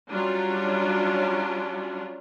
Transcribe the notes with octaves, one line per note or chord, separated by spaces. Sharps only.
F#3 G3 C#4 D4 F4